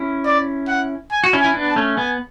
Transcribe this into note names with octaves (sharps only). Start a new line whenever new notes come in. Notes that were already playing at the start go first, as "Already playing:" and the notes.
Already playing: C#4 E4
D5
F#5
G#5
F#4
C#4 E4
G#5
E4
B3 D4
A5
A3 C#4
B3 G#5